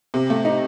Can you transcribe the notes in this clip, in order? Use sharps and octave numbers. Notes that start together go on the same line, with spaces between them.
C3
A3
D#4